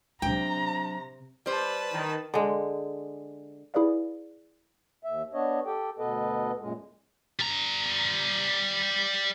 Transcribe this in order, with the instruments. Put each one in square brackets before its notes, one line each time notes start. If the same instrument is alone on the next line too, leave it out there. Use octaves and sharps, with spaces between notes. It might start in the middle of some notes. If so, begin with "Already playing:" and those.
[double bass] C3 [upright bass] F#3 D4 [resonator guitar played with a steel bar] G5 [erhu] A#5
[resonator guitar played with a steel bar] G3 C5 [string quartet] B4 A5
[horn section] D#3
[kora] D3 G#3
[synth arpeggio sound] E4 G#4 B4 D5 F5
[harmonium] D#2 E5
B3 D4 C#5 D#5
G4 A4 G5
D2 B2 B3 A4 B4 D#5
F#2 A#2 G#3
[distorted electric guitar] G3 A#5